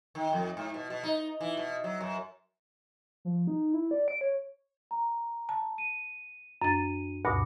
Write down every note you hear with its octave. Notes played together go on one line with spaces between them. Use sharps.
D#3
F2
G#2
B2
B2
D#4
E3
B2
F#3
F#2
F3
D#4
E4
D5
D7
C#5
A#5
A5
D#7
F#2 D4 A6 D#7
D2 G2 B2 D6 C#7